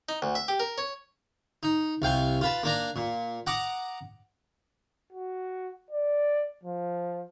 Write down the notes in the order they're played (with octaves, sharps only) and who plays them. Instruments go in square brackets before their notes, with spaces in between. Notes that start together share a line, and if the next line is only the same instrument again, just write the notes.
[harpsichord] D#4
D2
E5
G4
A#4
C#5
D#4
C2 F5 G5 G#5
F4 B4 A5
A#3 D4 A#5
A#2
F#5 A#5 D6 D#6
[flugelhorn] F#4
D5
F3